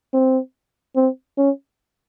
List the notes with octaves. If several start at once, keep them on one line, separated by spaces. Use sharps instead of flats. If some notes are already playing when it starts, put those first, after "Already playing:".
C4
C4
C#4